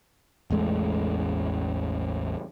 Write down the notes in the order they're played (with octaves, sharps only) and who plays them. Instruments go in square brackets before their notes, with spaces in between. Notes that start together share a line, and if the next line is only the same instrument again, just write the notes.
[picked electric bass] A1 E2 G#3 A3